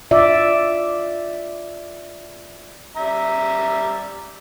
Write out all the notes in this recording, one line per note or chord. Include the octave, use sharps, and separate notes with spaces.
F4 D5 E5
G3 E5 A#5